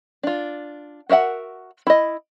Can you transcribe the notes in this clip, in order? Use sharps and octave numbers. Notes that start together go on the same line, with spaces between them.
D4 F4
F#4 A#4 E5 F#5
E4 D#5